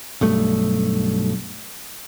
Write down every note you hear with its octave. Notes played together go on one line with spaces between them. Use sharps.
B1 G2 A3